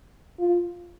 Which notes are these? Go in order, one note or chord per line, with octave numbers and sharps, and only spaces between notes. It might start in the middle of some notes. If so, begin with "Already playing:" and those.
F4